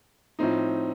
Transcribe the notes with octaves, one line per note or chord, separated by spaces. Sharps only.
A2 F3 C4 D#4